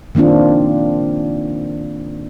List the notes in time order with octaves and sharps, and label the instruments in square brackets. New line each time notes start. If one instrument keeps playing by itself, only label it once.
[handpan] D#3 A#3 C4 D4 F4